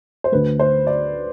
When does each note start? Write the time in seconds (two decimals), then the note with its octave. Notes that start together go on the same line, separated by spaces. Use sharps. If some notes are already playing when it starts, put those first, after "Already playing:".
0.24 C5
0.32 D2 D3 A3 B4
0.60 C5
0.87 D5